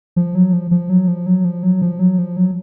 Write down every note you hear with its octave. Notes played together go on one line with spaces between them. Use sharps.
F3
F#3
F3
F3
F#3
F3
F#3
F3
F#3
F3
F#3
F3
F#3